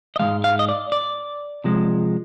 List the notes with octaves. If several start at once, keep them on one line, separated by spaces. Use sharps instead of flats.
D#5
G#2 F3 G#3 F5
F5
D#5
D5
D5
C3 F3 G#3